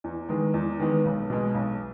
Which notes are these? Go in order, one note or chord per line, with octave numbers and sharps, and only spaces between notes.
E2
D#3 G#3 B3
E2
D#3 G#3 B3
B1
B2 G#3
B1